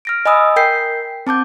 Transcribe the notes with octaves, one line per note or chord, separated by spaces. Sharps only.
F6 A#6 D7
D#5 G#5 B5 D#6 E6
A#4 G5 G6 B6 C7
C4 A5 D6 G6